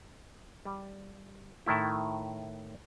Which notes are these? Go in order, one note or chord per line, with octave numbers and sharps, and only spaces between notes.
G3
A2 D#3 A3 E4